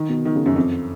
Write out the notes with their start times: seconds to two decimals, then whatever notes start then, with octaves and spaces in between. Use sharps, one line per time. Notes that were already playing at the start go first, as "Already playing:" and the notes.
Already playing: D#3
0.09 B2
0.25 D#3
0.35 C#3
0.46 F#2
0.56 F2